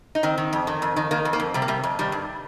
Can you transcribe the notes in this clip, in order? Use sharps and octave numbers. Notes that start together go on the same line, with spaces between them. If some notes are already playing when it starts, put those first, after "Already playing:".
D#4
D#3 C4
D#3
F2
D#3
F2
D#3
D#3 A#3
F2
A#3
F2
C3 G3
A#3
C3 G3
F2
D#3 G3
G2